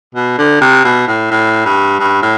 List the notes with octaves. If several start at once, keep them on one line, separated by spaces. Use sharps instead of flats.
B2
D3
C3
B2
A2
A2
G2
G2
A2